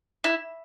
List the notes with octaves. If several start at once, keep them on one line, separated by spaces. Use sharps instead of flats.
E4